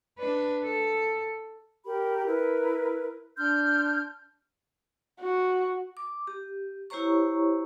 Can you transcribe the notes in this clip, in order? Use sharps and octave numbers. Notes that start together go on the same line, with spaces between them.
D4 B4
A4
G4 A#4 B5
E4 A#4 B4
D4 C6 F6 G6
F#4
D6
G4
E4 G4 C5 C#5 A#5 C#6